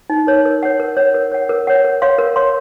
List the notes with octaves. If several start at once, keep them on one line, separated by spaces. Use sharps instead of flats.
D#4
A#4 C#5
A#4
C#5 F#5
A#4
C#5 F#5
A#4
C#5 F#5
A#4
C#5 F#5
A#4
C#5 F5 C6
A#4
C#5 F5 C6